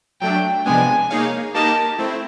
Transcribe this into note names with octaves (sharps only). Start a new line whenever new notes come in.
F#3 A3 D4 G5
C3 F3 G#3 B3 D4 G#5
A#3 D#4 G#4 C#5 F5
A#3 D#4 G4 A#4 D#5 A5
A3 C4 E4